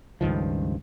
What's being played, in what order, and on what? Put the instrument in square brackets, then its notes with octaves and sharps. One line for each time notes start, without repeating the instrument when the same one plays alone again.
[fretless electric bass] C#2 G2 D#3 F3